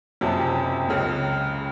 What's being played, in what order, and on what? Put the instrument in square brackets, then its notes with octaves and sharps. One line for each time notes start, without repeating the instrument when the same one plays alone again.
[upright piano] F#1 F2 C3 F#3
C#2 C#3 G#3